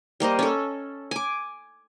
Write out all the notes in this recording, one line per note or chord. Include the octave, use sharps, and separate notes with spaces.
G3 A#3 C5 D#5
C#4 A4
G#5 D6